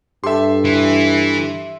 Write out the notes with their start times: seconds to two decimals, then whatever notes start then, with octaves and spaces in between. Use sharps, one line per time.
0.24 G2 G4 A4 E5 C6
0.65 E3